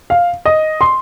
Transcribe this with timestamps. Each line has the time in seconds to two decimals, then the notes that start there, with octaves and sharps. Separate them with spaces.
0.10 F5
0.46 D#5
0.81 C6